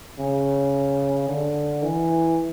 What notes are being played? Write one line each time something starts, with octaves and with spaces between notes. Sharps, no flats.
C#3
D3
E3